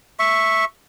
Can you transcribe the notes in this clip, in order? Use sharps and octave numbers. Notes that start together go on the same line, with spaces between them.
E5 C#6